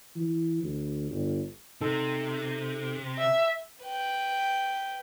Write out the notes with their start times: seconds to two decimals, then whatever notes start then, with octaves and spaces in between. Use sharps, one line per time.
0.16 E3
0.64 D2
1.11 G1
1.81 C3 D#4 A4
3.19 E5
3.83 B4 G5